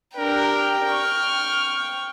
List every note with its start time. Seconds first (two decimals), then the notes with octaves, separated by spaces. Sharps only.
0.17 D4 G4 A#4 G5
0.89 C#6 F6